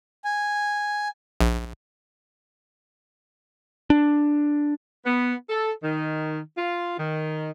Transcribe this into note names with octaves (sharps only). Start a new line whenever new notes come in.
G#5
A#1
D4
B3
A4
D#3
F4
D#3